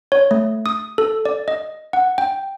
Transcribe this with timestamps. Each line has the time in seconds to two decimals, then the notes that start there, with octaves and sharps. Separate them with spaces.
0.12 C#5
0.31 A3
0.66 D#6
0.98 A4
1.25 D5
1.48 D#5
1.93 F#5
2.18 G5